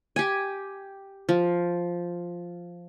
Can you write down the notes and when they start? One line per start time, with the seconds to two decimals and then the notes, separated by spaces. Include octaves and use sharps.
0.16 G4 G#5
1.29 F3